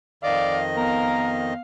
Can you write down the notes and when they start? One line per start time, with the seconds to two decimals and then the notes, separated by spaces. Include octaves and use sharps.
0.24 F2 D#3 D5 D#5 F5
0.77 B3 A#4 F5